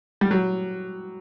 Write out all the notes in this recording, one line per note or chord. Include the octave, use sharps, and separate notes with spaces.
G3
F#3